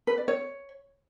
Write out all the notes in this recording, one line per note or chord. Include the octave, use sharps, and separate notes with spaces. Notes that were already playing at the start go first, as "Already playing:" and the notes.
B4
D5
C#5